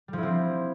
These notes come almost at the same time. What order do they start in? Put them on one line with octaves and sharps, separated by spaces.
G3 F3 E4 C4